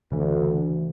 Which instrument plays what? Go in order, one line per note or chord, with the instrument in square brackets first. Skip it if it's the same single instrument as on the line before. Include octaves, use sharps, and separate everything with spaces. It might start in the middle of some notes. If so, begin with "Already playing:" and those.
[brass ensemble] D2 [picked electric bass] C#3 E3